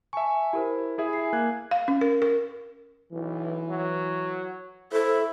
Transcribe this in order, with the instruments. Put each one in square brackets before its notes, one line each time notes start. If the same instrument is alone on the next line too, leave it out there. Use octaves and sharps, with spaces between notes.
[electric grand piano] E5 C#6 [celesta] G#5 A5
[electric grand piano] E4 [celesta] G4 A#4 C5
[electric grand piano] E4 G#4 E5
[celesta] G#5 C7
[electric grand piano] A#3 F#6 G#6
[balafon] F5
C#4
A#4
A#4
[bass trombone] B1 [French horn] E3
[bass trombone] F#3
[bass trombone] E4 [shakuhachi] A4 [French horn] C5